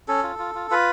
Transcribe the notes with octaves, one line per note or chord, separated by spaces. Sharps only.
C#4 A4
F4
F4
F4
F4 B4